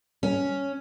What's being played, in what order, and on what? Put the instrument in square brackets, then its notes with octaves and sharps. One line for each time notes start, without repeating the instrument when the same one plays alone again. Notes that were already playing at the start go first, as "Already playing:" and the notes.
[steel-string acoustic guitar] C#4